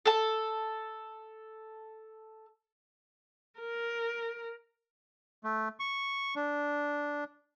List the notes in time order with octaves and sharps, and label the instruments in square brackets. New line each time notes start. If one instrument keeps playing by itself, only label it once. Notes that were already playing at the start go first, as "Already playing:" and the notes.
[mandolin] A4 A5
[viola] A#4
[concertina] A3
C#6
D4